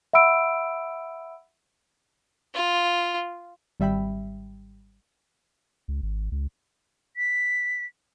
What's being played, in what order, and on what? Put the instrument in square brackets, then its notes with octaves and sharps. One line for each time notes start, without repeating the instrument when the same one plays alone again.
[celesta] E5 F#5 B5 E6 D7
[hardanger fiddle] F4
[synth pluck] G#1 G3 E5 G5 B5
[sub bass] C#2
G#1
C#2
[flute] B6